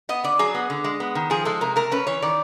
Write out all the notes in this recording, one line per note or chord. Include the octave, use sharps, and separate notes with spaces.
B3 D#5
D3 D5
F#3 G#4
B3
D3
G#3
B3
D#3
F3 G#4
G#3 A4
C3 A#4
A3 A#4
C#4 B4
E3 C#5
D#3 D5